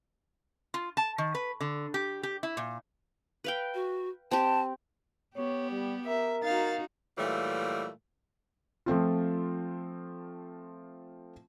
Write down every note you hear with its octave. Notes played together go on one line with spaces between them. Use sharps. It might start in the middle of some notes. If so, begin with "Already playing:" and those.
F4
A5
D#3
B4
D3
G4
G4
E4
A#2
B4 F5 G5
F#4
C4 G4 A5
B3 G4 C#5
G3
A#4 E5
D#4 F#4 F5 A6
A#2 E3 F#3 G3 A3
F3 A3 C4 F4